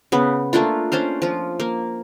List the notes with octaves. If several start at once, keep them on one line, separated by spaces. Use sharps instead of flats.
C#3 B3
A3 A#3 D4 F4
C#4 D4 C5 F5
F3 F4
A#3